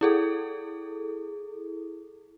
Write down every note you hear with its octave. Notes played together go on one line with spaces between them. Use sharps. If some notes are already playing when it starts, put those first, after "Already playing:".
E4 G#4 A4